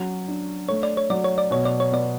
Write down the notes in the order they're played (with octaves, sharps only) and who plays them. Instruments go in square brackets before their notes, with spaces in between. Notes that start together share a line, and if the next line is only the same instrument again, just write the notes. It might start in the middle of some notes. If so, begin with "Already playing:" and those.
Already playing: [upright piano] F#3 C#4
D4
[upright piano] A3 [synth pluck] C#5
[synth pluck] D5
C#5
[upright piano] F#3 [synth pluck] D5
[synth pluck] C#5
D5
[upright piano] B2 [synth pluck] C#5
[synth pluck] D5
C#5
[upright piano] B3 [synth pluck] D5